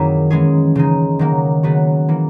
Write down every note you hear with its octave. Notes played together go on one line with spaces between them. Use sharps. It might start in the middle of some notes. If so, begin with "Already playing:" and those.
Already playing: F#2 D#3 F#3 A#3 C#4 E4 G#4
E3 G#3 C#4 G#4
C#3 G#3 D#4
D#3 F#3 A#3
C#3 F#3 B3 F#4
E3 A#3